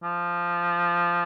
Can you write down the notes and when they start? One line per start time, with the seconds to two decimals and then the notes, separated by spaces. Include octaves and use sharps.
0.03 F3